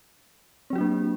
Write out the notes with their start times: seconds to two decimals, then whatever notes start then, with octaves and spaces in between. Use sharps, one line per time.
0.70 C4
0.73 F#3
0.76 F#4
0.78 D4
0.81 A#3